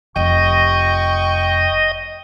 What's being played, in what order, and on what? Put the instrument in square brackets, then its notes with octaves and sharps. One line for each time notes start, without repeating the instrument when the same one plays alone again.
[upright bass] F1 [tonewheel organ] D#5 [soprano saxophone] G5 [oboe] C#6